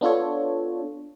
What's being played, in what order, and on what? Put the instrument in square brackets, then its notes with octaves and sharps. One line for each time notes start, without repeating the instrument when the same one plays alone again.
[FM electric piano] B3 D4 F4 A4 C#5